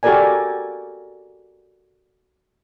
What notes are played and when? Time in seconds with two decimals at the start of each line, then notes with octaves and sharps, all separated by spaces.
0.03 F#4 G4 A4 A#4 D5 G#5